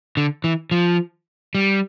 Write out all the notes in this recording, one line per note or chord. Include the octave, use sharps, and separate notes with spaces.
D3
E3
F3
G3